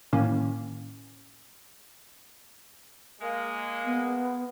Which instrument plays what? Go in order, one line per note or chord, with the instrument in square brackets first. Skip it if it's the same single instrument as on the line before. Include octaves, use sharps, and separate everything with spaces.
[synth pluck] A2 D#3 A#3 C#4
[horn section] G#3 A#3
[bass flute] B3